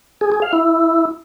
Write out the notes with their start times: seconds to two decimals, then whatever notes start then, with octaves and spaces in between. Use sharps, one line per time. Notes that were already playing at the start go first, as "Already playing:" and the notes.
0.21 G#4
0.32 G#4
0.42 F5
0.53 E4